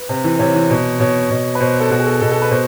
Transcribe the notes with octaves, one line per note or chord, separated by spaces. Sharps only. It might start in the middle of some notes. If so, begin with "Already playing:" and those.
Already playing: B4
C3
E3
C3 C#5
E3
B2
B2 C#5
B2
B4
B2 C5
A4
B2 F#4
G#4
A4
B2 A4
A4
B4
B2 C5